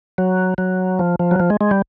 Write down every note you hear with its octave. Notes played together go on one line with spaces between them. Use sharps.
F#3
F#3
F3
F3
F#3
F3
G#3
G#3
G3